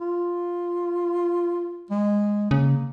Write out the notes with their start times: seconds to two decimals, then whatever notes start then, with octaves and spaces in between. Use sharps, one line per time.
0.01 F4
1.91 G#3
2.51 C#3 A#3